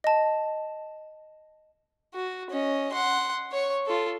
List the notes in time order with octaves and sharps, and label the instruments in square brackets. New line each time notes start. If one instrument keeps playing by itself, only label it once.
[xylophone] D#5 A5
[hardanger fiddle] F#4
C#4 D#5
F#5 C6
C#5 C#6
F4 A4